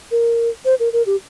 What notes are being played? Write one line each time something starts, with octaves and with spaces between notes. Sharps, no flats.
A#4
C5
A#4
A#4
G4